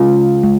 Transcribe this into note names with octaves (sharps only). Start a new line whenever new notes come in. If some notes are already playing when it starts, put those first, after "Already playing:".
Already playing: C#3 G#3 F4
G#3